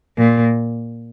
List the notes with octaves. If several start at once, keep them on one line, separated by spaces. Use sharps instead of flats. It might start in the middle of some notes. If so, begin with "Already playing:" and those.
A#2